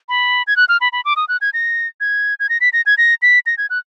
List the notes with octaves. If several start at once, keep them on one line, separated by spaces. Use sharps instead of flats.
B5
G#6
F#6
F6
B5
B5
D6
D#6
F#6
G#6
A#6
G#6
G#6
A#6
B6
A#6
G#6
A#6
B6
A#6
G#6
F#6